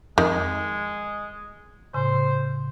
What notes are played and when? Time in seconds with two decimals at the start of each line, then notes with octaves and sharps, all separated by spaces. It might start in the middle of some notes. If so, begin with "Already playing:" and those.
0.18 F2 D#3 G#3
1.94 A2 C#3 C5 G#5